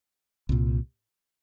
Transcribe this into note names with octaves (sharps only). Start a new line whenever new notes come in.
C2 A#2